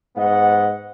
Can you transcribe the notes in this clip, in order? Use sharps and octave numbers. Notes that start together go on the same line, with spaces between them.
G#2 B3 D#5 F#5